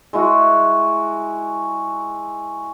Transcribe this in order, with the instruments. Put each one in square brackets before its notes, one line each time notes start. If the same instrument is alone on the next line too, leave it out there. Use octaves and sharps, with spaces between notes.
[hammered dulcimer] G#3 E4 F#4